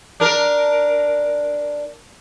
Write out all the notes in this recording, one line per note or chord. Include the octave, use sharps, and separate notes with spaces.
D4 A#4